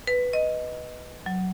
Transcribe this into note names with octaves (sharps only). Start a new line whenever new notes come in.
B4
D#5
F#3